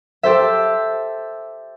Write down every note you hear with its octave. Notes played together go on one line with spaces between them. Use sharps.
G4 A4 C5 E5